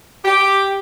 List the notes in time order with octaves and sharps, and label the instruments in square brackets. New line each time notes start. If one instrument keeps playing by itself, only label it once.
[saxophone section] G4